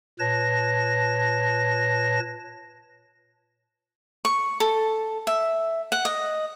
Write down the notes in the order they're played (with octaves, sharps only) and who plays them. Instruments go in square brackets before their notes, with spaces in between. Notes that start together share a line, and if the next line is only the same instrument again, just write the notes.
[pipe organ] A#2 B4 C#5 A5 A#6
[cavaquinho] C#6
A4
E5
F#5
D#5